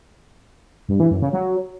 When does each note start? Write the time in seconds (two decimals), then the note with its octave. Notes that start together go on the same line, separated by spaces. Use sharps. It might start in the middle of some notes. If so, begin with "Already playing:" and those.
0.89 G2
1.00 E3
1.11 F#2
1.22 C#3
1.33 F#3